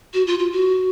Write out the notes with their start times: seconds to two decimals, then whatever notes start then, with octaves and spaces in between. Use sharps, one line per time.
0.14 F#4
0.27 F4
0.39 F4
0.52 F#4